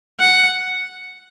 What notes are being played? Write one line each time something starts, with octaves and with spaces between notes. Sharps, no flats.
F#5